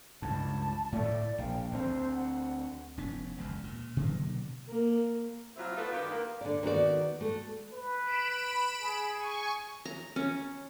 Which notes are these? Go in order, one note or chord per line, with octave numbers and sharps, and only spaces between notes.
C#2 G2 A5
A2 A3 D5
A#1 F5 G5
D2 C4 C5
F#5
F1 B3 C#4
E1 C#2 F#2
A#2
B2 D3 F#3 A#3
A#3
C3 F#3 C4 E4 F4
A3 B3 D#4 F4 A4 B4
G2 D#3 B3 F4 G4
A#3
D3 D5
D#3 B3 F#4 D5
A3 F#4
B4
B5 D7 E7
G#4
G#5 C#6
A#5
C#4